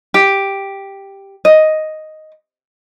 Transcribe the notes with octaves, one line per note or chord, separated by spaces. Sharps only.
G4
D#5